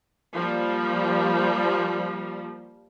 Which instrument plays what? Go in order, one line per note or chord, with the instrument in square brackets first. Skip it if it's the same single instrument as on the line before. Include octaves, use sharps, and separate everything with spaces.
[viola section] F3 G3 A#3